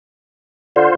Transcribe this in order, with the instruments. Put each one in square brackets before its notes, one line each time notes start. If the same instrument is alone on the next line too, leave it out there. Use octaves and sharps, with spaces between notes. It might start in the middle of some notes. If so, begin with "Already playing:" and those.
[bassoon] D3 [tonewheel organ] F4 C5